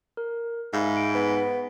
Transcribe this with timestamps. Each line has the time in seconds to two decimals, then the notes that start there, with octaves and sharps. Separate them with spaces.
0.17 A#4
0.73 G#2 E5 F5 B5
0.93 B5 D7
1.15 B3